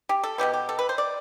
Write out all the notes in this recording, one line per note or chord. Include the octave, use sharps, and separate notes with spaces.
G4
A4
B2 G3 B3 G4
G4
A4
B4
C5
D5